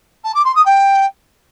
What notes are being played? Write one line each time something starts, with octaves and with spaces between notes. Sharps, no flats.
A5
D6
C6
D#6
G5